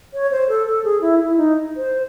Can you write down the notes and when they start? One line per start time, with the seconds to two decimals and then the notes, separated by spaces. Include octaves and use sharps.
0.14 C#5
0.31 C5
0.49 A4
0.66 A4
0.84 G#4
1.01 E4
1.19 E4
1.37 D#4
1.77 C5